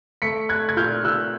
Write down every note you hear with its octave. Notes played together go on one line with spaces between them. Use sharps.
A3 B6 C#7
A3 F#6 G#6
G#6
A#2 F6 G6
A#2 E6 F#6